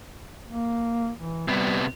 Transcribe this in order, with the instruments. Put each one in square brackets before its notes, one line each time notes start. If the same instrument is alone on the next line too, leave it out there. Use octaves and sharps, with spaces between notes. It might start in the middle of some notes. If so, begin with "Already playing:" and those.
[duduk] A#3
E3
[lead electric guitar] C3 B3 [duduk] G3